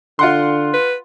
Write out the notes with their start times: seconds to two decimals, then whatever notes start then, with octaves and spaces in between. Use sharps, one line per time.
0.19 D3 F4 F#5 C6
0.73 B4